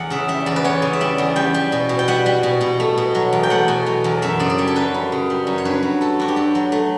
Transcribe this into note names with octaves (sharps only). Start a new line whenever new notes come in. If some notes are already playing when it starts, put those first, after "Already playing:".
Already playing: E2 F#5
C#3 E5
G3 E5
E2 D5
B4
E2 C#5
C#3
E5
G3 D5
E2
G3 G5
G3
B2
B2
G5
G3 F#5
G3
B2
B2
A3
B2
F#3
E2
G5
A3 F#5
B2
F#3
E2
F#2 E5
C#3 D5
D5
G3 C#5
A4
F#2 B4
F#2
C#3
G3
F#2
C#5
G2 B4
F#3
A3 A4
G2 F#4
G4
G2 A4
F#3
A3